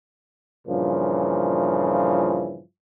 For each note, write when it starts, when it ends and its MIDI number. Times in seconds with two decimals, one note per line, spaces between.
0.68 2.60 43
0.68 2.60 46
0.68 2.60 49
0.68 2.60 52
0.68 2.60 53